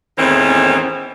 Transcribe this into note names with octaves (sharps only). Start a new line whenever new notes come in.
E2 A2 D#3 E3 C4 C#4